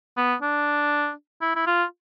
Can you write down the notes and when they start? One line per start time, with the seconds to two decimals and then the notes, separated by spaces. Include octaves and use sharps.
0.17 B3
0.42 D4
1.41 E4
1.56 E4
1.66 F4